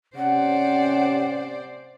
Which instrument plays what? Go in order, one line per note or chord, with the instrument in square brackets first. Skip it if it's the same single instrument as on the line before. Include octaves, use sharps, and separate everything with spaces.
[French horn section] C3 C#4 [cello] C5 D5 [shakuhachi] F#5